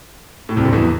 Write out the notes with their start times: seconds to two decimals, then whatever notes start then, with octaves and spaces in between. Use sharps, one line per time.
0.49 A2
0.56 C2 C3
0.65 D2 D3
0.73 E2 E3